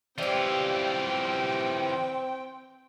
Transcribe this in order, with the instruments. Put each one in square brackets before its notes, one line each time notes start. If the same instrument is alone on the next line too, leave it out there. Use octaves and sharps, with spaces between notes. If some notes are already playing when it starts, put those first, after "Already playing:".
[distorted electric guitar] E3 F4 [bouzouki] G3 G4 [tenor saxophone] C4 [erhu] G5